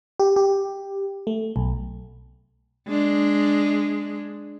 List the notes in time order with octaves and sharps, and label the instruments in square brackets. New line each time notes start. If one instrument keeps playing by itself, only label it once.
[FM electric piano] G4
G4
A3
B1
[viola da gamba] G#3 D4